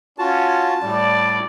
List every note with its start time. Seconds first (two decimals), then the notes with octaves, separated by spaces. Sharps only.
0.19 C#4 F4 F#4 A5
0.83 A2 G3 D5